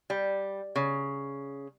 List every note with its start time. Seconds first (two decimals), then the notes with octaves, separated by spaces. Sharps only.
0.10 G3
0.76 C#3